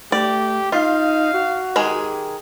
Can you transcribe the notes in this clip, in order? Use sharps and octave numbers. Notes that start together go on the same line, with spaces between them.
A3 G4 D5
D#4 F4 F5
F#4
D#3 G#3 G4 G#4